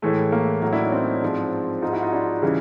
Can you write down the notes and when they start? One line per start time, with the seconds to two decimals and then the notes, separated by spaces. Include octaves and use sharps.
0.02 A2 E3 G#3 A3
0.32 A#3
0.62 A2 F#3 A#3
0.73 D4 E4
0.82 C#4 D#4
0.92 C4 D4
1.22 G#2 F3 G#3
1.82 G#2 F3 G#3 D#4 F4
1.93 E4 F#4
2.02 D#4 F4
2.12 D4 E4
2.42 C#3 E3 G3